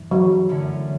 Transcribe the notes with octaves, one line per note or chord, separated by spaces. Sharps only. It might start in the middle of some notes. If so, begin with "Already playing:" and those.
Already playing: G2 E3
F#3
F#2 D3 A3 C#4 E4